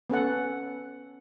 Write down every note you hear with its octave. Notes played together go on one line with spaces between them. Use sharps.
B3 C#4 A4 F#5